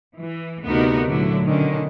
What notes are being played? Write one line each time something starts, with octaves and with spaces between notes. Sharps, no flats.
E3
D2 C3 B3 D#4 F#4 A#4
A#2 D3 F#3 A3 D4 E4
B2 D3 D#3 C#4 D4